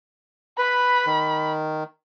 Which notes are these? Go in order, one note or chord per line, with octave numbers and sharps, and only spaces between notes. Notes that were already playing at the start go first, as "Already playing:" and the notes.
B4 B5
D#3